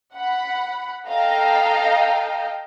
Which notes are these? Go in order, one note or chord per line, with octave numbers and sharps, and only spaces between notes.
F#5 B5
A4 D#5 F5 G5 A#5